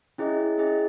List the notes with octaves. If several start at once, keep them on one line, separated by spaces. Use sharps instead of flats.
C#4 E4 G#4 D#5
C#4 E4 G#4 D#5